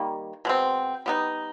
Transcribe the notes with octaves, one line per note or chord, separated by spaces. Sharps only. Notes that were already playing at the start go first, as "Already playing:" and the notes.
Already playing: D#3 G3 A#3
B2 G#3 C4
G3 B3 D#4